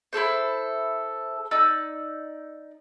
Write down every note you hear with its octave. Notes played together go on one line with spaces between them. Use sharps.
E4 G#4 A4 C5
D#4 D5 E6